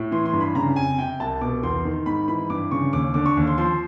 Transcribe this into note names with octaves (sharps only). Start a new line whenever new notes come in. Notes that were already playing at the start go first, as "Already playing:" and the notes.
Already playing: A2
E3 C6
C6
G2
B5
C#3 A#5
F2 G#5
C3 G5
C2 A5
B2 D6
E2 C6
D#3
G#2 B5
E3 B5
G2 D6
C#3 C#6
D#2 D6
D3 D6
C#6
D#2
C6
F3 C6